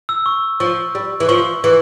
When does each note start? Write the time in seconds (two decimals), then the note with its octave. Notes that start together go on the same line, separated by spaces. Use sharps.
0.09 E6
0.26 C#6
0.60 F3 C#6
0.95 G3
1.20 E3
1.29 F3 C#6
1.64 E3